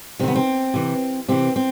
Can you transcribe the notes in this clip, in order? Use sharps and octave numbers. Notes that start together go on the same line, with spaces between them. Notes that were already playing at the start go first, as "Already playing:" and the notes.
C3 D#3 B3 C4
C4
C3 E3
C3 E3 C4
C4